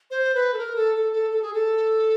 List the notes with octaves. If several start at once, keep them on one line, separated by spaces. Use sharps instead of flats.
C5
B4
A4
A#4
A4
A4
A4
A4
G#4
A4